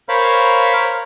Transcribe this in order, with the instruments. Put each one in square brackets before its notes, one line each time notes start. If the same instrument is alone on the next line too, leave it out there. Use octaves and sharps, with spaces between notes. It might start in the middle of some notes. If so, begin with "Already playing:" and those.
[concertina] A#4 C5 C#5 F5 B5